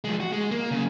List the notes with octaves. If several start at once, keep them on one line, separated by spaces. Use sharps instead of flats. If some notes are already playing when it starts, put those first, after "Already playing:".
F3 G#3
F#4
G#3
A#3
F#2 C#3